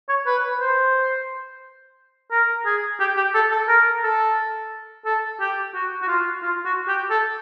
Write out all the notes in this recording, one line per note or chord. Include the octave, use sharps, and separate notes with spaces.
C#5
B4
C5
A#4
G#4
G4
G4
A4
A4
A#4
A4
A4
G4
F#4
F#4
F4
F4
F#4
G4
A4